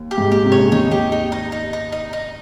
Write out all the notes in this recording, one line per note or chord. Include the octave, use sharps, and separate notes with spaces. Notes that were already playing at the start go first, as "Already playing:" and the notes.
Already playing: D#2
G4
G#2
A#2 G4
C3
C#5
C#3
D#2 D#3 D#4
G4
D#4
D#4
D#4
D#4
D#4
D#4